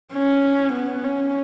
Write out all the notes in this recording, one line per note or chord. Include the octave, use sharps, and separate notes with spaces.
C#4
B3
C#4